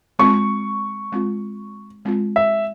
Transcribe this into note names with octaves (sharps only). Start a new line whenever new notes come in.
G#3 C4 F4 C#6
G#3 C4 F4
G#3 C4 F4
E5